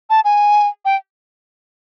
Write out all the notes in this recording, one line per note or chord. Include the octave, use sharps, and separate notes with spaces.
A5
G#5
G5